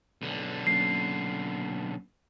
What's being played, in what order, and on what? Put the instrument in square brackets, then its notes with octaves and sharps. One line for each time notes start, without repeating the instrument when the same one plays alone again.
[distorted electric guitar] B1 D3
[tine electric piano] F#3 A#3 C#4 [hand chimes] C7